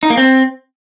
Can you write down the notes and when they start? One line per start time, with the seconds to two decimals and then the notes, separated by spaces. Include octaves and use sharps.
0.03 D#4
0.10 A#3
0.17 C4